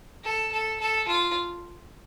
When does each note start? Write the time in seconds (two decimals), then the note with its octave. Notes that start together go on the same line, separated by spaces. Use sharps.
0.24 A4
0.53 A4
0.81 A4
1.08 F4